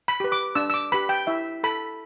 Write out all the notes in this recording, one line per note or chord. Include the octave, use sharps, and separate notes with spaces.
B5
G4 B4
D6
D4 E6
E6
D6
G4 B4 B5
G5
E4 E5
A4 B5